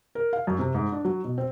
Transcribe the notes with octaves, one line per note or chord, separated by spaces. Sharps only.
A#4
F5
F#2
C3
G#2
D4
F#3
B2
C4